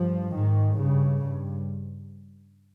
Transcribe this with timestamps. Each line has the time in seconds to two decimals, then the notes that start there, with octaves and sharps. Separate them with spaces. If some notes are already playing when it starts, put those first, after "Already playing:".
Already playing: G2 F3
0.34 G#2 D#3
0.78 G2 C#3
1.22 G2